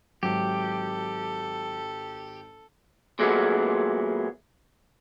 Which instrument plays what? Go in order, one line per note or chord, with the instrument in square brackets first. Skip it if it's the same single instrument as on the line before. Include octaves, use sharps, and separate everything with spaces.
[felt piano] G#1 [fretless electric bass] F#3 [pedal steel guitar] G4 [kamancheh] A4
[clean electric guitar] A#2 F#3 G#3 A3 B3